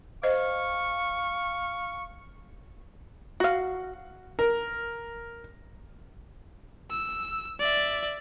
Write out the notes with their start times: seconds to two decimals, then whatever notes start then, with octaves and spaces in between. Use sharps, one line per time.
0.23 C5 D#5 F5 C#6
3.40 F#4 F5
4.39 A#4
6.91 E6
7.59 D5 E5